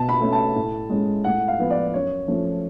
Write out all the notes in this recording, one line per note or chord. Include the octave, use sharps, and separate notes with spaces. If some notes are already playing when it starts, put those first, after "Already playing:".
Already playing: B2 A5
B5
A3 C#4
A5
A2
G#3 C#4
A2 F#5
F5
F3 B3
D5
F#2 C#5
F3 A3 C#4